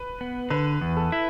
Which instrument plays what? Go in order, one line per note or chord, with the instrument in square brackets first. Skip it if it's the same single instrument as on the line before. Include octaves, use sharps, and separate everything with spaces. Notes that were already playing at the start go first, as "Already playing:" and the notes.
Already playing: [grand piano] B4
[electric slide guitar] B3
[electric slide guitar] D3 [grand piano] B4
[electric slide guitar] E2
[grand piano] A4
[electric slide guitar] E4